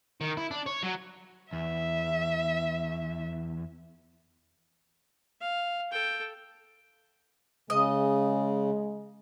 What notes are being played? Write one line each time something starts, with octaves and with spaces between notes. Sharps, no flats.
D#3
E4
D4
C#5
F#3
E2 E5
F5
A4 G5
C#3 G#3 D#5